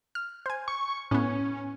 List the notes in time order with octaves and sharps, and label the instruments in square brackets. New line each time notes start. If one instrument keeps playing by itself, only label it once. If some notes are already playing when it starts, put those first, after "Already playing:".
[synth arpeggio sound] F6
C5 G#5
[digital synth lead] C#6
[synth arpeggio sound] A2 B3 [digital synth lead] C#4